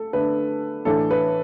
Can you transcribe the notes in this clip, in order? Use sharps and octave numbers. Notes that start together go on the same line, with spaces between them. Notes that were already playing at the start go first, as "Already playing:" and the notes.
Already playing: A3 A4
D3 A3 D4 B4
A2 E3 D4 A4
B4